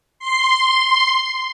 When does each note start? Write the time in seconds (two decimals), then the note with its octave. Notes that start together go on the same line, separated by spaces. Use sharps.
0.19 C6